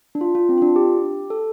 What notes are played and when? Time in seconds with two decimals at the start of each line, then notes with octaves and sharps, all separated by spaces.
0.15 D4
0.21 F4
0.35 F4
0.49 C4
0.58 F4
0.62 D4
0.76 G4
1.30 A4